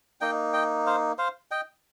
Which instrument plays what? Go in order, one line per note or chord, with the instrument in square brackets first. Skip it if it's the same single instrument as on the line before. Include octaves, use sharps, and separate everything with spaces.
[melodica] A#3 D#4 D#5 G5
D#5 G5
C5 F5
C5 F5
D#5 G5